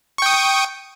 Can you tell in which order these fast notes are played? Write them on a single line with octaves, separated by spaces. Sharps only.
C#6 G5 D#6